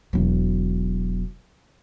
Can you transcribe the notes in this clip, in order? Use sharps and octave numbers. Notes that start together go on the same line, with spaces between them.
E1 F#3